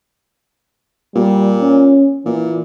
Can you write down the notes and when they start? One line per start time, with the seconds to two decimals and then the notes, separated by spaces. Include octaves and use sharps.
1.15 A#2 G3
1.61 C#4
2.26 A#2 E3